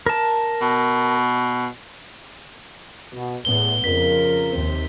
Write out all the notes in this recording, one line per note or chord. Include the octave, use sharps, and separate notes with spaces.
A#4 A5
B2
B2
E2 A2 B3 G7
F2 C#3 F4 A#4 B6
D#2 C3 C4